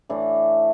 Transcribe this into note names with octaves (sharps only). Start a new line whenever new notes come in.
A2 E3 A3 D4